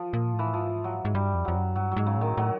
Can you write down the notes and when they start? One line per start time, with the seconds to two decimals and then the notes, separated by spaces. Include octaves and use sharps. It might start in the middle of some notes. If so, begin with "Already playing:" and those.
Already playing: F3
0.13 A#2
0.33 A2
0.39 E3
0.53 G#2 F3
0.84 F#3
1.05 G#2
1.14 G2 G3
1.34 F2
1.45 F2 F#3
1.56 F#2
1.76 G2 F#3
1.92 G#2 F#3
2.06 C#3
2.17 A2 D#3
2.37 A2 F#3